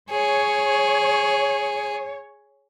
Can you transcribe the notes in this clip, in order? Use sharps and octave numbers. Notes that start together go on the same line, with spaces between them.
G#4 C#5